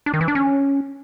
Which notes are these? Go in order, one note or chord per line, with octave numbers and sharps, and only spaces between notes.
D4
D#3
E3
D4
C#4